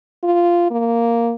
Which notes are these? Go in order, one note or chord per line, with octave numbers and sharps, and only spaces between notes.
F4
A#3